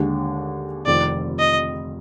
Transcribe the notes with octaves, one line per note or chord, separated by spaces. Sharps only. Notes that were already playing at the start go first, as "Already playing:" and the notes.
Already playing: D#2 D3 G#3 D4 G4
F1 F2 D#3 D5
D#5